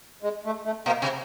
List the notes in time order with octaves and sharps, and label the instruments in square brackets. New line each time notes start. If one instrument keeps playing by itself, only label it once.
[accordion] G#3
A3
A3
[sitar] B2 [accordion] A#3
[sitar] C3 [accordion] C4